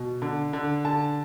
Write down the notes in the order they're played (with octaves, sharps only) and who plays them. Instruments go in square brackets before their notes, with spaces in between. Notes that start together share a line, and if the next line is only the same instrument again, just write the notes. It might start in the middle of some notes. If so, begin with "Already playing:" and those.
Already playing: [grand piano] B2
D3
D3
D3 A5